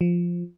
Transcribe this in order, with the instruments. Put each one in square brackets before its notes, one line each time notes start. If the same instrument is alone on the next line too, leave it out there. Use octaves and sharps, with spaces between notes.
[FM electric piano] F3